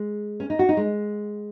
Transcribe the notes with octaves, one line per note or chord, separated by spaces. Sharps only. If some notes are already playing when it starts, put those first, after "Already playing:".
Already playing: G#3
C#4
D#4
F#4
D#4
G#3